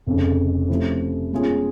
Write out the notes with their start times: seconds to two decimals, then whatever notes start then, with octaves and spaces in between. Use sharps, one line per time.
0.07 F1 F2 C#3
0.69 C3 F3 A3 C#4 E4
1.31 B2 G#3 C#4 F4 G#4